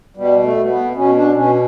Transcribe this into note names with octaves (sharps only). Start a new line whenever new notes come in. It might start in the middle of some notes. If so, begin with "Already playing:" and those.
B2 G3
A3
B2
B3
B2 C#4
D4
B2 C#4